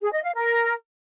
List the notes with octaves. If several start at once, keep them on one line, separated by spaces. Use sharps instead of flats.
G#4
D#5
F5
A#4